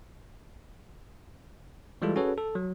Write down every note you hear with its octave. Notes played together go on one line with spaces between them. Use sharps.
E3 G3 G#3 E4 F4 A4
C#4 F#4 G#4 A4 B4 C#5
A4
F#3